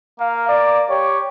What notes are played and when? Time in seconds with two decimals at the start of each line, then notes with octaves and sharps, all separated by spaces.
0.20 A#3 F5
0.49 D5
0.90 G4 C#5